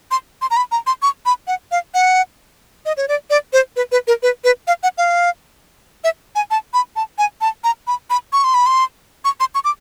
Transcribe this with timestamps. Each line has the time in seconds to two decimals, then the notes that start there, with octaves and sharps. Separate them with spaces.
0.11 C6
0.42 C6
0.51 A#5
0.57 B5
0.72 A#5
0.87 C6
1.02 C#6
1.26 B5
1.47 F#5
1.71 F5
1.94 F#5
2.86 D#5
2.97 C#5
3.08 D5
3.30 D5
3.53 C5
3.76 B4
3.92 B4
4.07 A#4
4.23 B4
4.44 B4
4.67 F5
4.83 F#5
4.98 F5
6.04 E5
6.35 G#5
6.51 A5
6.74 B5
6.96 A5
7.18 G#5
7.41 A5
7.64 A#5
7.87 B5
8.10 B5
8.33 C#6
8.44 C6
8.54 B5
8.66 C6
9.25 C#6
9.40 C6
9.55 C#6
9.64 D6